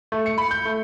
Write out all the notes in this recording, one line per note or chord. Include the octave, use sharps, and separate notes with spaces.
A3
C#7
B5
G6
A3